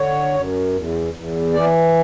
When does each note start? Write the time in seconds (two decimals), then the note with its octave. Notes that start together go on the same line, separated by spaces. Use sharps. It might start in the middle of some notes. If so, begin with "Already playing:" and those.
Already playing: D3 C#5
0.34 F#2
0.73 E2
1.14 E2
1.53 E3 D5